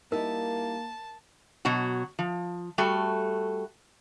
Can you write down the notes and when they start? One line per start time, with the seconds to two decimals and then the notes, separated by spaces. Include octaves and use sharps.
0.12 G3 A#3 D#4 E4 A#4 A5
1.65 B2 F#3 F#4
2.19 F3
2.78 G3 A3 F#4 A4